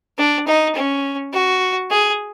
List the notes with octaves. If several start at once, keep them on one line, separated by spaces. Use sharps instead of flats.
D4
D#4
C#4
F#4
G#4